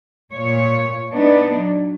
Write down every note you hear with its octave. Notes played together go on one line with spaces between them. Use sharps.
A#2 C#5
B3 D4 D#4
F#3